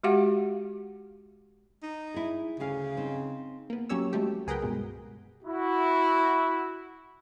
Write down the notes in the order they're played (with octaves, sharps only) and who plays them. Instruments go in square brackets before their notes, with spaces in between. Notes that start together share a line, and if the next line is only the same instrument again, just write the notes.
[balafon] G#3 F#4 G4 F5 F#5
[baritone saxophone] D#4
[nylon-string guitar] E4 G#4
[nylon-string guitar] D2 G#4 F5 [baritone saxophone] C#3
[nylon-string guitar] C4 D#4
[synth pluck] A#3 B3
F#3 A#3 C#4 G4 C#5 E6
F#3 G#3 A3 G4
C#2 G#4 A#4 B4 F#5 G5
G2 B2 G#3
[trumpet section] E4 F#4